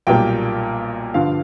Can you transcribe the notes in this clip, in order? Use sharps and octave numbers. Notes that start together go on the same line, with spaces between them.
B1 A#2 G3 A#3 G5
G2 D3 F3 F5